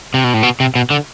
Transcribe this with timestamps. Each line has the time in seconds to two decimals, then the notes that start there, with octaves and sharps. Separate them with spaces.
0.14 C3
0.24 B2
0.34 A2
0.43 B2
0.60 C3
0.75 B2
0.90 D3